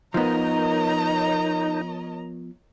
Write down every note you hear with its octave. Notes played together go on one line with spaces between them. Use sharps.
F3 B3 D#4 A#4 C#5 D#5 A#5